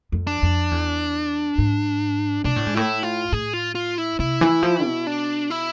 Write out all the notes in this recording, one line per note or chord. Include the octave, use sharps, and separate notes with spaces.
F2
D4
F2
E2
G#2
B2 D4
A2
G#2
A2 E4
F4
A2 G#4
F4
F4
E4
C3 E4
E3
F3
B2
D4
E4